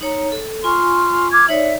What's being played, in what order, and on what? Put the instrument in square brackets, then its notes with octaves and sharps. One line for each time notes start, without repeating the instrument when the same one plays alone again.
[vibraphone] D#4 C#5 A#5
A4
[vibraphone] F4 G#5 C#6 [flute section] C6 F6
[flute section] D6 F6 G#6
[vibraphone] D#4 C#5 D5 [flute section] E5